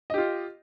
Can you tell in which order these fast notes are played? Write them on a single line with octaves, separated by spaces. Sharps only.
D#5 G4 F4